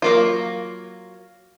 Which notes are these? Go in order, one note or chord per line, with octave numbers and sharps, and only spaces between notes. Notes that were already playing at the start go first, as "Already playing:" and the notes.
F#3 A#3 F4